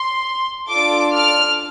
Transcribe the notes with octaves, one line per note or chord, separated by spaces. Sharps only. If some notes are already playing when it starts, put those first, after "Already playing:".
Already playing: C6
D4 F4 A4 D6
F6